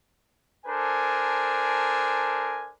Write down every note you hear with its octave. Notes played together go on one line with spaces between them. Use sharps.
D4 A4 A#4 C5 G#5